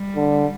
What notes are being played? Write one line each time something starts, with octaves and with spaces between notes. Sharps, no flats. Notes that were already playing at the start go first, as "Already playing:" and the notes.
Already playing: G3
D3